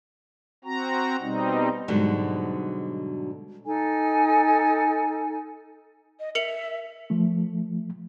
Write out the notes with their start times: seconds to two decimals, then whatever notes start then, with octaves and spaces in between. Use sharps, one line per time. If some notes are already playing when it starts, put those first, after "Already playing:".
0.64 C4 F#4 A#5
1.20 B2 G3 C4 D#4
1.88 G#2 B2 D3 F#3 G3
3.66 D#4 A4 G#5
6.20 D#5
6.35 A#4 E5 C#7 F7
7.10 F3 A3